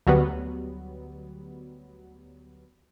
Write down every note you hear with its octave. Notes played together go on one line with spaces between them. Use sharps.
D2 F#3 G3 B3